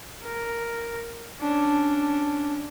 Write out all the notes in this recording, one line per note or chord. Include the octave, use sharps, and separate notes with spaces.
A#4
C#4 D4